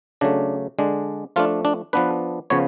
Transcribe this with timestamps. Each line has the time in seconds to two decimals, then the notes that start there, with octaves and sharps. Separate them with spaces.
0.21 C#3 F#3 A3 D4
0.79 D3 G#3 D4
1.36 F3 A3 D4 F4
1.65 D4
1.93 F3 B3 D4 B4
2.50 C#3 F3 B3 C#5